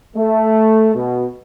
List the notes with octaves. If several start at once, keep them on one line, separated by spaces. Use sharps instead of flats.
A3
B2